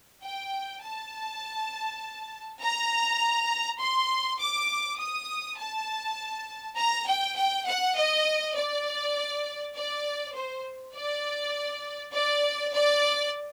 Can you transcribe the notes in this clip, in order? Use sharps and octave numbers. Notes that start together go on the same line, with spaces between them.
G5
A5
A#5
C6
D6
D#6
A5
A#5
G5
G5
F#5
D#5
D5
D5
C5
D5
D5
D5